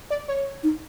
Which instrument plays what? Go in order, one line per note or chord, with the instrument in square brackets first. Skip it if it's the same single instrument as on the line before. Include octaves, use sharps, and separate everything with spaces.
[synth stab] D5
C#5
[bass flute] D#4